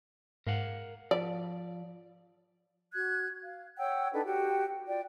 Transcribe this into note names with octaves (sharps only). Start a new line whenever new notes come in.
G#2 A#4 F5 F#5
F3 D5
F#4 F#6 G#6
F5
C#5 F#5 G5 E6
D4 D#4 A4 B4
F#4 G4 G5
F4 D5 G5